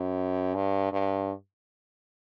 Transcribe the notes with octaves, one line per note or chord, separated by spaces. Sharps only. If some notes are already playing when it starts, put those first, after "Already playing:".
Already playing: F#2
G2
G2